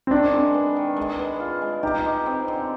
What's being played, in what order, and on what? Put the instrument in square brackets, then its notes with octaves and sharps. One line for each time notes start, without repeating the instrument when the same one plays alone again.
[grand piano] C4
[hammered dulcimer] D#3 [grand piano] D4
[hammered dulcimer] G#3
B3
D#3
G#3
B3
F4
G#3
[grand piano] D#4 [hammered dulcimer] G4
[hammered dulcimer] G#3
C4
D3